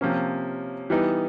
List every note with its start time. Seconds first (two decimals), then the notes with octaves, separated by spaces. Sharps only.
0.01 C3 F3 A#3 C#4
0.90 E3 G3 B3 D#4